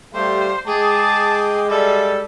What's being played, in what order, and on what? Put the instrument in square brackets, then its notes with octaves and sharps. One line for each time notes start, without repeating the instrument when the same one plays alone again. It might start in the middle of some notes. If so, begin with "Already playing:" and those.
[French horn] G3 [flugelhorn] A3 [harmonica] G4 F5 [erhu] C5
[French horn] G#3 [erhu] G#4 [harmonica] G5 D6 [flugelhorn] A5
[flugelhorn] G3 [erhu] A4 [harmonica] D5 E5